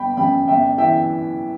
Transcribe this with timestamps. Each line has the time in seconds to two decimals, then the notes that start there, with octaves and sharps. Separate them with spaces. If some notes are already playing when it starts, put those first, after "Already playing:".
Already playing: G1 G5 B5
0.17 F#2 G5 B5
0.48 G1 E5 G5
0.78 E3 E5 G5